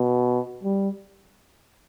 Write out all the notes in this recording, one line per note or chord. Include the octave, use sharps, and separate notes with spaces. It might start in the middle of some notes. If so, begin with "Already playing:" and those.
Already playing: B2
G3